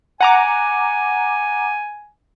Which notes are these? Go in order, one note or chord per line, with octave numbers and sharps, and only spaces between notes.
F#5 G#5 A#5 D6